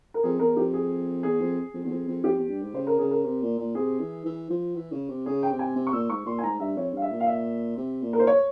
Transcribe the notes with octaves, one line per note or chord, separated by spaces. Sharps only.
A#4
F2 G#4
E2 A#4
F2 G4
G#4
E2 G#4
F2
F2
E2
F2
F2
F2 G4
E2
G2
G#2
C#3 C5
A#4
C#3 G#4
A#4
C3
A#2
A#2
C3 G#4
E3
E3
F3
E3
C#3
C3
C#3 G#4
G5
C3
G#5
C3
C#6
A#2 E6
G#2 C#6
A#2 C6
G#5
G#2 A#5
G2 E5
F2 C#5
G2 F5
E5
A#2
F5
E5
C3
A#2
A#4
C5
C#5